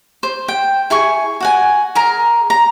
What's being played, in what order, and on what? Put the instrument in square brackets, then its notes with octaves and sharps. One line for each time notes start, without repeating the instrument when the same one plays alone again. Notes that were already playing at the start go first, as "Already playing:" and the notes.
[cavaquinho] C5
G5
E4 G#4 G#5 C#6
F#4 F#5 G#5
G#4 A#4 A#5
A#5